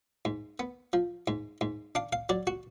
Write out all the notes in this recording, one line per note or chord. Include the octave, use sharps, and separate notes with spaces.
G#2
B3
F3
G#2
G#2
D4 F5
F5
F#3 D5
F#4